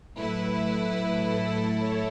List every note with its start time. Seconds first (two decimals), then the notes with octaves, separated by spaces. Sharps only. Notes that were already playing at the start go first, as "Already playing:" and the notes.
0.17 A2 F#3 A3 E4 B4
1.24 A4
1.79 C#5